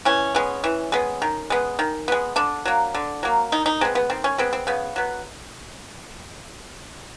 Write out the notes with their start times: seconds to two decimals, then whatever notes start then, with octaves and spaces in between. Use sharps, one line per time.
0.05 E3 C#4
0.35 G#3 B3
0.64 E3
0.92 G#3 B3
1.22 D#3
1.50 G#3 B3
1.79 D#3
2.08 G#3 B3
2.36 D3 D4
2.65 F#3 A#3
2.95 D3
3.23 F#3 A#3
3.52 D#3 D#4
3.66 D#4
3.81 G#3 B3 C4
3.95 B3
4.10 D#3 C4
4.24 C#4
4.38 G#3 B3 C4
4.53 C4
4.67 C#3 B3
4.96 F#3 B3